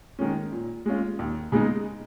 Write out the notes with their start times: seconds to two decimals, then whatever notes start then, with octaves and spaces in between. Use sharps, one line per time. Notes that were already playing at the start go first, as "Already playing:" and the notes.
0.19 D#3 G#3 C#4
0.52 A#2
0.86 G#3 C#4 F4
1.19 D#2
1.52 C#3 G#3 B3 D#4